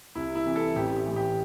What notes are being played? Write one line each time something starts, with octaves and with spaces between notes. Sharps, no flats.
C2 E4
E4
C3 E3
A4
A1 G4
G4
A2 E3
G4